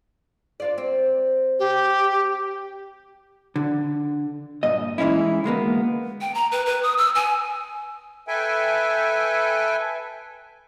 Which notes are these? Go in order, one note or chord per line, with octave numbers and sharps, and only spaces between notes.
D4 F4 D5
C4
G4
D3
G2 A#2 D#5
E3 G#3 C#4 D#4 E4
D2 G#3 A#3 B3
G5
A#5
B4
B4
D#6
E6
G#5
A4 B4 E5 G5 G#5